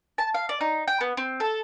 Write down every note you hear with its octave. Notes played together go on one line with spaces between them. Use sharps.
A5
F5
D5
D#4
G5
B3
C4
A4